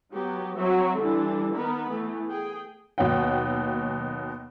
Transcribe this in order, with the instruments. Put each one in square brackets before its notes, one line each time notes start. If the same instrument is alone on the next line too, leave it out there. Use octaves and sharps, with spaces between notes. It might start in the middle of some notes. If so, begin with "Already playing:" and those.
[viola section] F#3 B3 G4
F#3 C4 F#4 E5
D3 E3 G3 D4
D#3 B3 A#4 B5
E3 A3 B3
G#4 G5
[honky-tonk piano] D#2 B2 D#3 F#3 F#5 G5